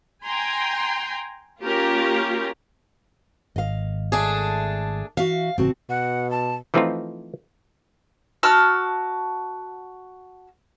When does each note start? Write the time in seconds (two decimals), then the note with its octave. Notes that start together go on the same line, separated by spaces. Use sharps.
0.24 G5 G#5 A#5 C6
1.60 A#3 C#4 F4 G4 A#4
3.56 G#1 D#5 F5
4.12 A3 D4 G#4
5.17 E3 F#4 E5 F5
5.58 A1 C#3 C4 F#4 A5
5.90 B2 F#5
6.31 A5
6.74 E3 F3 A3 C4 D#4 F4
8.43 F#4 A5 E6 F6